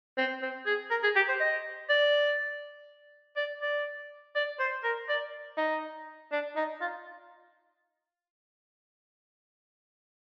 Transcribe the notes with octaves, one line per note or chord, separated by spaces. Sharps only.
C4
C4
G#4
A#4
G#4
G4
C5
D#5
D5
D5
D5
D5
C5
A#4
D5
D#4
D4
D#4
F4